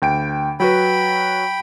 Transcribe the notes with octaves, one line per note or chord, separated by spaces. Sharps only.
D2 G5 D7
F#3 F#4 B4 G5 B5